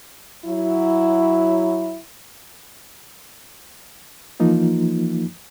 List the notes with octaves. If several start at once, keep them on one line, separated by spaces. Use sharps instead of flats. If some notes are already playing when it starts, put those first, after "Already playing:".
F#3 E4
E3 F3 A#3 D#4 F4